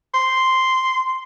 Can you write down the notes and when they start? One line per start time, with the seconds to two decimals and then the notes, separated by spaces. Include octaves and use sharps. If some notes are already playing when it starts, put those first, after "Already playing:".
0.14 C6